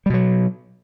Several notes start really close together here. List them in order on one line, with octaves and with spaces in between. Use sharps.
G3 B2 F#3